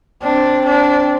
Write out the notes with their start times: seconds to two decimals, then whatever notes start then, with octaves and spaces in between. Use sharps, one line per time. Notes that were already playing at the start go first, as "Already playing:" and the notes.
0.23 C4 D4
0.66 D4